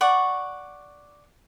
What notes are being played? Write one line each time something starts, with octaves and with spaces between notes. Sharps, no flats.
D5 F#5 C#6